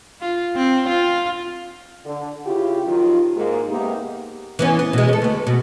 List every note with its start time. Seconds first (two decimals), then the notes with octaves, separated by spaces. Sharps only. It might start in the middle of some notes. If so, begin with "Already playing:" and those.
0.21 F4
0.56 C4
0.89 F4
2.06 D3
2.46 C#3 E4 F4 G4
2.87 D#3 F3 F#3 F4
3.36 G#2 A#3
3.69 C3 G#3 A#3 B3 D#4 G4
4.59 E3 B3 C#4
4.79 B3
4.93 B2 G#3
5.09 C#4 A4
5.22 D2 B3
5.47 B2